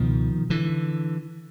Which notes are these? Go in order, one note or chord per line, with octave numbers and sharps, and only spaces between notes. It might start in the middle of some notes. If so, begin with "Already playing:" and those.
Already playing: C#2 B2 D#3 F3
D3 E3